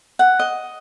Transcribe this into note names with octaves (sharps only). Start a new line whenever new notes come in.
F#5
D#5